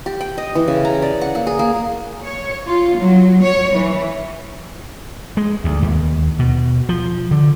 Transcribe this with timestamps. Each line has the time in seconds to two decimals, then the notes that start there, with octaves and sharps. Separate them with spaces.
0.06 G4
0.21 G5
0.38 D#5
0.55 E3
0.68 C#3
0.85 A#5
1.02 D5
1.21 F#5
1.35 A#3
1.47 G#4
1.59 A#3
2.24 C#5
2.67 F4
2.98 F#3
3.43 C#5
3.76 E3
5.37 G#3
5.64 D2
5.82 D#2
6.39 B2
6.89 F3
7.31 D3